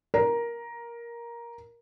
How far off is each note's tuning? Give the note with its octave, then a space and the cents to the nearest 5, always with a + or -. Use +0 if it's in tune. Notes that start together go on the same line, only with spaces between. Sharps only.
A#4 +10